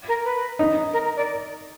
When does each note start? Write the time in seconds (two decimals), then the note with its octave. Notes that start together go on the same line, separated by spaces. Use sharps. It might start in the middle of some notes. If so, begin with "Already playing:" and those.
0.08 A#4
0.25 B4
0.59 D#4
0.93 A#4
1.05 A#4
1.16 D5